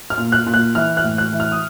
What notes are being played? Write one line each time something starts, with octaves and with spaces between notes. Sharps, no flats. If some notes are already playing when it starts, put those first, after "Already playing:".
F6
A#2
F#6
A#2
F#6
E3 F6
F#6
A2
F#6
E3
F6
D#6